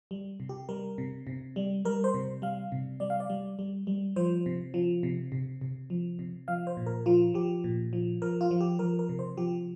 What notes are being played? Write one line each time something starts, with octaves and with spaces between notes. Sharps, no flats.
G3
C3
G4
G3 A#4
C3
C3
G3
G3 A#4
C5
C3
G3 F5
C3
G3 D5
F5
D5
G3
G3
G3
F3 C5
C3
F3
C3
C3
C3
F3
C3
F3 F5
C5
A#2
A#4
F3 F4
F3 G4
A#2
F3
F3 A#4
F4
F3
G4
F3 A#4
A#4
C3
C5
F3 G4